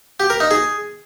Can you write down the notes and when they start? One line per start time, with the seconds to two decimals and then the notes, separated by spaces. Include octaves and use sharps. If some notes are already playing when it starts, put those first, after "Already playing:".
0.20 G4
0.30 A#4
0.40 D#4
0.51 G#4